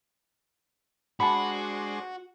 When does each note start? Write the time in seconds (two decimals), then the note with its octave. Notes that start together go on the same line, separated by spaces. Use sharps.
1.20 G#3 D4 F#4 C5 A5 B5